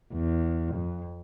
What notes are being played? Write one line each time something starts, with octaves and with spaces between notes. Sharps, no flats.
E2
F2